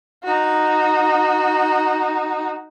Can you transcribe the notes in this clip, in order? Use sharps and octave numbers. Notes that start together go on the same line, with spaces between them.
D#4 F#4